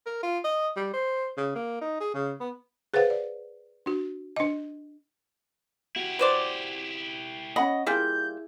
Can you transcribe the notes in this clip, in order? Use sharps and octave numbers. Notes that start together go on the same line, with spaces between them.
A#4
F4
D#5
G3
C5
C#3
A#3
D#4
G#4
C#3
B3
G#4 B4 C5 F5 F#5
D5
D4 F#4
D4 D#5
E4 F#4 G4
B4 C5 D5
C#4 D#5 F#5 B5
G3 A#3 E4 F4 G#4 G6